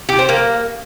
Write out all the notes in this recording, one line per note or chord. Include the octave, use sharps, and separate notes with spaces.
G4
C5
A#3